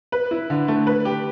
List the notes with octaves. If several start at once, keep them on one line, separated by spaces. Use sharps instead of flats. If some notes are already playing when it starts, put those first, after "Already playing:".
B4
E4
D3
A3
B4
G4